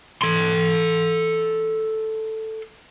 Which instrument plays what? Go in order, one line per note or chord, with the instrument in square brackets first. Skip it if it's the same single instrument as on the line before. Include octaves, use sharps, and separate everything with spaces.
[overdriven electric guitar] A4 C6